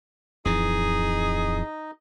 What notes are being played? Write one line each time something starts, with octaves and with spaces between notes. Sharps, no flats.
D1 F2 E3 D#4 G#4 D#5